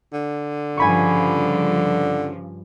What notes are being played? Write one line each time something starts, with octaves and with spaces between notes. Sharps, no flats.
D3
G2 C#3 F3 G#5 B5 C#6